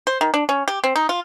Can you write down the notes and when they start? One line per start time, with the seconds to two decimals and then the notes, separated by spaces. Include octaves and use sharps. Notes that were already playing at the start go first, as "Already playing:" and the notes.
0.07 C5
0.21 D#3
0.34 D4
0.49 C#4
0.68 G4
0.84 C4
0.96 D#4
1.09 F4